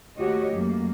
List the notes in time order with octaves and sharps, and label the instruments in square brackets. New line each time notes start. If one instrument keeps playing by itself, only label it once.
[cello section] D#2 A3 F#4 G4 C#5 D#5
F#2 A3 A#3